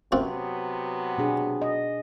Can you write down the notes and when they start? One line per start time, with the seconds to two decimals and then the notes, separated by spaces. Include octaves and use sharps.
0.12 F#2 C3 F#3 B3 C4 F4
1.18 B2 D4 G#4
1.62 D#5